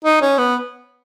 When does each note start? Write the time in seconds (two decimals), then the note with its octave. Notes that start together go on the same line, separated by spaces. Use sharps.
0.05 D#4
0.22 C#4
0.38 B3